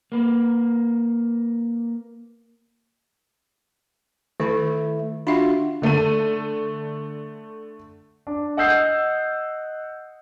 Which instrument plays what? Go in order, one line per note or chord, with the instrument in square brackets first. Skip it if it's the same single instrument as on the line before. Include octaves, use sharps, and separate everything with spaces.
[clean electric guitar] A#3 B4
[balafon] D#3 [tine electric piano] A3 E4
[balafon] D4 E5 [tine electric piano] F4 F#4
[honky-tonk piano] D3 A3 A4 D#7
[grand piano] D4
D#5 F#5 D#6 E6 G6 C7